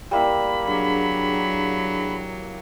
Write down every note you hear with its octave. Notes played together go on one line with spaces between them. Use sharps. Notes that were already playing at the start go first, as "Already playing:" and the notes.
G3 A#3 E4 B5
F#3 D4 G#4 F#5